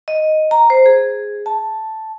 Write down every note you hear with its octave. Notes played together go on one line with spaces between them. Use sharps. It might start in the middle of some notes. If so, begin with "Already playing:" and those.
D#5
A#5
C5
G#4
A5